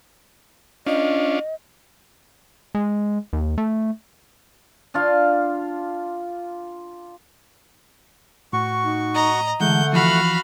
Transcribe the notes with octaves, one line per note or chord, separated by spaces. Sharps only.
C#4 D4 F4 D#5
G#3
D#2
A3
D4 F4 F5
A2 F#4 C#6
D#4
D#5 A#5
D3 E3 G#3 A3 F#5 G6
E3 F3 F#4 F5 B5